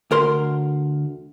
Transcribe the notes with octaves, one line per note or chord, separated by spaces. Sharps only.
D2 A#4 C6